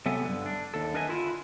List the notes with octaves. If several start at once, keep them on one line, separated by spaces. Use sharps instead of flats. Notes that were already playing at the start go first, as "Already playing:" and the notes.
C3 F#3 B3 A4 E5 G#5
G2 D3
D4
D#2 A4
D4 A#4 B4 D#5 E5 G#5
D3 E4 F4